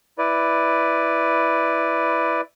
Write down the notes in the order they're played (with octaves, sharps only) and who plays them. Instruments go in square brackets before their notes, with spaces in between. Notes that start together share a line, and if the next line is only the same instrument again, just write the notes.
[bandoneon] E4 B4 D5